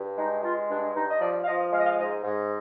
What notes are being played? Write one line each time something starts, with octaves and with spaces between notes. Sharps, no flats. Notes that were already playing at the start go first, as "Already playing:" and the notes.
Already playing: G2
G#3 D#4
G#3 F4
G2 D4
G2 D#4
D#5
F3 D5
F5
F3 D#5
G#3 F5
D#5
F5
G#2 D#5
G#2